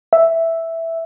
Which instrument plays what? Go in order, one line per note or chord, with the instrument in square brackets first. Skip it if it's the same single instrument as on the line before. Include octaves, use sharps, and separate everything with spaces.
[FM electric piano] E5